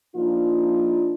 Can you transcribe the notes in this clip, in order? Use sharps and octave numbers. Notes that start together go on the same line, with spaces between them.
A#2 F3 D4 D#4 F4